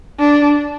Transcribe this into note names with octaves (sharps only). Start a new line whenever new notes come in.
D4